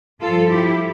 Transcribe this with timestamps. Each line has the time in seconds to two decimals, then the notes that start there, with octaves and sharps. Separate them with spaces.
0.21 G2 F3 F4 A4
0.49 E4 G4